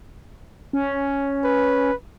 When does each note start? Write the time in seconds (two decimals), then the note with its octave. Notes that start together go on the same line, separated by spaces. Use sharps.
0.73 C#4
1.45 B4